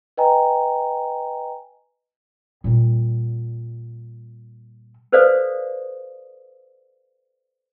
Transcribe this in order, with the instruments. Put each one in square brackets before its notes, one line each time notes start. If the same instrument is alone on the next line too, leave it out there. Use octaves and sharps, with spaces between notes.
[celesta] B4 D#5 G5 G#5 A#5
[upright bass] A#2 G3
[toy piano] A4 B4 C5 D5 F5 D#6